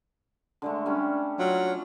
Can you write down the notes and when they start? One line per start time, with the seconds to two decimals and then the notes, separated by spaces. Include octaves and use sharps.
0.62 D3 G#3 A3
0.86 G3 C#4 D4
1.39 F#3 F4 F5